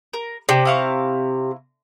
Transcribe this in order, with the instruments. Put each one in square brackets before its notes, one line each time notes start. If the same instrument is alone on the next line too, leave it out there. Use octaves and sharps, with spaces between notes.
[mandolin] A#4
[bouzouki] C3 [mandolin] D4 G4
[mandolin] E4 F5 C#6